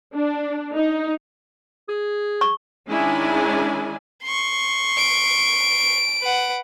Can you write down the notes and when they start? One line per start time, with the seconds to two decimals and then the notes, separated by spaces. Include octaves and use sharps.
0.14 D4
0.75 D#4
1.89 G#4
2.41 C#6
2.88 D#3 G#3 C#4 D4 E4 G#5
4.23 C6 C#6
4.98 D7
6.21 B4 F#5